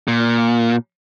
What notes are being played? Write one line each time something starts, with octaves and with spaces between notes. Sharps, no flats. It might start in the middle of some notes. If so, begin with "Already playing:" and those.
A#2